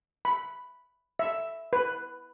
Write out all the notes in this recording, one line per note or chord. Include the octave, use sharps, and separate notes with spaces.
B5
E5
B4